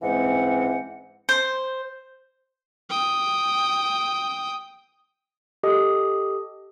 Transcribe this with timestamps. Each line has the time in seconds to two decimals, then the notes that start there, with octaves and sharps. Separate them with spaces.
0.02 G#2 E3 G#3 C4 C#4 F#5
1.29 C5
2.90 G5 D#6
5.63 G4 A4 D#5 D#6